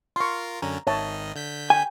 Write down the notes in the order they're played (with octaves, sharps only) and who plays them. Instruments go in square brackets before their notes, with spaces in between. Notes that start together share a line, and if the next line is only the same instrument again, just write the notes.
[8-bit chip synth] F4 A#4 [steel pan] C6 C#6
[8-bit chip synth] F#2 D3 C#4 [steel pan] A#5
[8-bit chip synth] G#1 D#3 D#5 [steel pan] C#5 E5 A5
[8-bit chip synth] D3 G6 B6
[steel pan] G5 [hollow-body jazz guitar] G#5